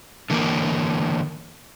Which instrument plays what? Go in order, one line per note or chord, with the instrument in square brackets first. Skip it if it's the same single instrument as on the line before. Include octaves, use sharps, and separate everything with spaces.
[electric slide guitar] D3 E3 A#3 A#4